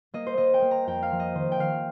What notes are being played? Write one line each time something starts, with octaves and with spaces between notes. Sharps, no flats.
A#3 D#5
C5
A#3 D#5
G5
A#3
A#5
F2 G5
F5
F3
D#5
D#3 C5
G5
D#3 F5